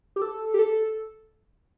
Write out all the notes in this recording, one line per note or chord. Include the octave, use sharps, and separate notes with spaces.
G4
A4
G4
A4